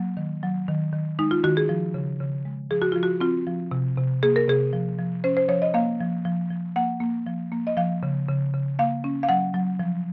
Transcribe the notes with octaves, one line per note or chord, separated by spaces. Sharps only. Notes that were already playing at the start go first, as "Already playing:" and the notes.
Already playing: F#3 A#3
D#3
F#3
D#3
D#3
G#3 D#4
F4
D#3 F#4
G#4
F3
C#3
C#3
G#3
F3 G#4
F#4
F3 F4
F#4
C4 F4
F3
C3
C3
A#3 G#4
A#4
C3 G#4
F3
F3
C#4 C5
C5
F3 C#5
D#5
A#3 F5
F3
F3
F3
A#3 F#5
A#3
F3
A#3
D#5
F3 F5
C#3
C#3
C#3
A#3 F5
C#4
F5
F#3 F#5
F#3
F3